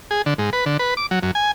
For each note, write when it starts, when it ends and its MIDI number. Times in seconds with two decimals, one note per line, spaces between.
0.11 0.22 68
0.26 0.34 50
0.38 0.50 44
0.53 0.65 71
0.66 0.77 50
0.79 0.94 71
0.97 1.06 86
1.11 1.19 54
1.23 1.31 42
1.35 1.51 80